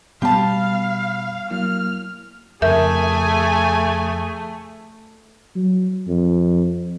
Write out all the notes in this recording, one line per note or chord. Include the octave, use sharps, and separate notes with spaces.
B2 G3 B3 G4 F5 A5 B5 F6
F#3 A#3 E4 F6
F2 C#3 A3 G#4 A#4 E5 G#5 G6
F#3
F2